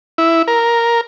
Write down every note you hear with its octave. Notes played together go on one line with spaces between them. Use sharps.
E4
A#4